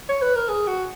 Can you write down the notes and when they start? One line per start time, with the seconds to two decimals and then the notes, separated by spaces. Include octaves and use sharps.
0.09 C#5
0.22 B4
0.36 A#4
0.49 G#4
0.67 F#4